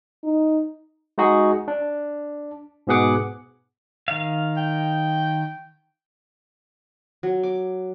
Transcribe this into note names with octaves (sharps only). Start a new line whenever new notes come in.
D#4
G#3 D#4 F#4 G#4
D4
G#2 B2 B3 G#4 F#5 D6
D#3 F5
G5
F#3
D6